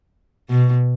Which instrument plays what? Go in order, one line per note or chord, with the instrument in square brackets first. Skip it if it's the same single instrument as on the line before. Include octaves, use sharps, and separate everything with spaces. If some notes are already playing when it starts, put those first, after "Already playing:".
[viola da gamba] B2